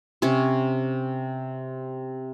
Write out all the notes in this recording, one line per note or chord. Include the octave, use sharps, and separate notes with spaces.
C3 C#4